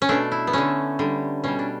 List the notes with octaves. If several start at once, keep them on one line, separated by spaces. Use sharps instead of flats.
C#4
B2 A3 D4
E4
B3
D3 A3 C#4
D3 G3
B2 G3 C#4
D4